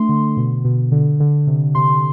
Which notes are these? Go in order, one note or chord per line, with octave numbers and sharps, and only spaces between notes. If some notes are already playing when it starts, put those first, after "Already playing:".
Already playing: A3 D4 C6
D3
B2
B2
D3
D3
C3
C3 C6